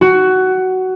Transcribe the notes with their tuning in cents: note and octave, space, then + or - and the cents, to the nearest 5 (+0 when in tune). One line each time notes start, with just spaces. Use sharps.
F#4 +15